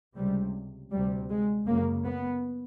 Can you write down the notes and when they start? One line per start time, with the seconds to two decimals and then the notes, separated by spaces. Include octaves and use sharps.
0.16 C#2 C3 G3
0.92 D2 C3 G3
1.29 G#3
1.67 F#2 C#3 A#3
2.04 B3